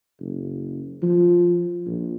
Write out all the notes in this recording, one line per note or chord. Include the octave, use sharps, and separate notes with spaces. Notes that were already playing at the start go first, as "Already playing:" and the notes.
F#1
F3
A#1